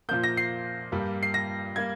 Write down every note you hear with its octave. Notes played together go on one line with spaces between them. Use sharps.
A#2 F3 A#3 G6
A#6
C7
G2 G3 A#3
C7
A#6
G3 A#3 G#6